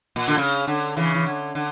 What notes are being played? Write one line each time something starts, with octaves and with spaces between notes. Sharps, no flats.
A#2
D3
C#3
D3
C#3 E3
E3
D3
D3